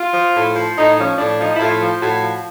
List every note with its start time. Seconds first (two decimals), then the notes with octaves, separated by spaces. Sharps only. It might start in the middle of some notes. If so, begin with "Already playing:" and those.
Already playing: F4
0.14 F3
0.35 A2
0.55 F3
0.76 A2 D#4
0.98 F3 C#4
1.18 A2 D4
1.39 F3 D#4
1.54 E4
1.60 A2 F4
1.81 F3
2.02 A2 F#4
2.23 F3